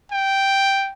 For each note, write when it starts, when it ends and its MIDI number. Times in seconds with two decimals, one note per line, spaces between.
0.12 0.92 79